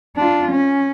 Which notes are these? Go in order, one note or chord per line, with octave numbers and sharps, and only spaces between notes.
D4 F4
C#4